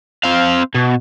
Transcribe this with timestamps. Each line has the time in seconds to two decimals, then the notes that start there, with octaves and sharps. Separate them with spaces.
0.23 C4 F5
0.75 B2